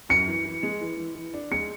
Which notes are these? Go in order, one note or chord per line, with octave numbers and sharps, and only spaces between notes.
F#2 C#7
E3
E3
G#3
E3
E3
E3
D4
G#3 C#7